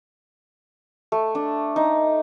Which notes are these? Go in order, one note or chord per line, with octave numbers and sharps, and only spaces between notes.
A3
D4
D#4